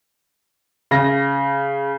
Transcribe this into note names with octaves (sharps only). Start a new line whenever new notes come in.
C#3 A#6